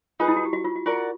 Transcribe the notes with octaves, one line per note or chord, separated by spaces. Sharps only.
D#4 F4 G#4 B4
E4
F#4
G4
F#4
F4
F#4
F4 F#4 A#4 D5